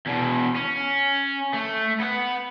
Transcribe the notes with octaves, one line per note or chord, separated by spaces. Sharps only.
E2 B2
C#4
A3
B3 F#5